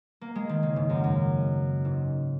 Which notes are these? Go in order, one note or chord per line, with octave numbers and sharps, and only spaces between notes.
A#3
G#3
D#3
C#3
G#2
F#2
F#2
G#2